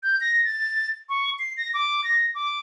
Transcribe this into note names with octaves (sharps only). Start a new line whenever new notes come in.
G6
A#6
A6
C#6
C7
A#6
D6
A#6
D6